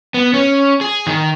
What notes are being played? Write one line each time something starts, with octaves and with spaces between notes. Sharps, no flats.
B3
C#4
G#4
D#3